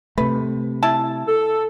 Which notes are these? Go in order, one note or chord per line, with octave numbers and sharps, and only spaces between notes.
C3 A3 B4
E4 A5
A4